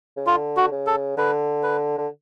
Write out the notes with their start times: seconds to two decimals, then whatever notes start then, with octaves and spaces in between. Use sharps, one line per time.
0.17 C#3
0.27 D3 F4
0.57 F#4
0.72 C#3
0.87 A4
1.18 D3 B4
1.63 B4
1.98 D3